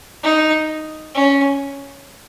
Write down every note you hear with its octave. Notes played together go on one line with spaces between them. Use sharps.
D#4
C#4